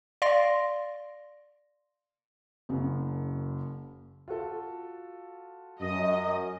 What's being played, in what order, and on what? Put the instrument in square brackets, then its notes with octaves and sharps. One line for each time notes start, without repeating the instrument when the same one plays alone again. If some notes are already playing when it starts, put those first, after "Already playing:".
[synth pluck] D5 F5 C6 A#6
[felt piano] F#1 F#2
[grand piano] F4 F#4 A4
[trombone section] F#2 [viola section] D#5